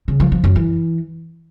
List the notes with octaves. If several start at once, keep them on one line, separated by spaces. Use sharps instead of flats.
C#3
F3
F3
F#2
E3